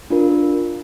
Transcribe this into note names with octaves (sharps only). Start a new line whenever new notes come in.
D4 F4 A#4